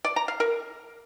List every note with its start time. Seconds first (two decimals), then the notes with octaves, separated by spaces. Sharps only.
0.05 D5
0.16 A#5
0.28 F5
0.40 A#4